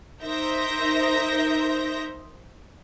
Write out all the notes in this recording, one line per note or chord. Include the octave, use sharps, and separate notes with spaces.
D#4 A#4 C5 E5 G6 A#6